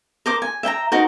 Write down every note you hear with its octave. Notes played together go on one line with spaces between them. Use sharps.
A#4 C5 D6
G#5
E5 G5 G#5 A#5
D#4 F#4 A#4 C5